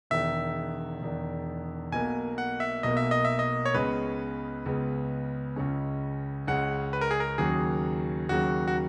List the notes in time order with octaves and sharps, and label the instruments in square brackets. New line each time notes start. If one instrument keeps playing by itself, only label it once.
[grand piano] E1 E2 D#3 [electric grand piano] E5
[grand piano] E1 E2 D#3
[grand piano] B1 B2 A#3 [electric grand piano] G#5
[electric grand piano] F#5
E5
[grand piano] B1 B2 A#3 [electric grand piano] D#5
[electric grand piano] E5
D#5
E5
D#5
C#5
[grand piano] C#2 C#3 G#3 B3 [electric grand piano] B4
[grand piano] C#2 C#3 G#3 B3
C#2 C#3 G#3 C#4
[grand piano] C#2 C#3 G#3 C#4 [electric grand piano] F#5
[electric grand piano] B4
A#4
G#4
A#4
[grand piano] D#2 C#3 F#3 [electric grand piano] G#4
[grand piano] D#2 C#3 F#3 [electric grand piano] F#4
[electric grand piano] F#4